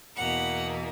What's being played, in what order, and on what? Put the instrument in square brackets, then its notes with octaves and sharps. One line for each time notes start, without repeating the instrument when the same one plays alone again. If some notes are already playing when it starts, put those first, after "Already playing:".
[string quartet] E2 B2 A#3 F#5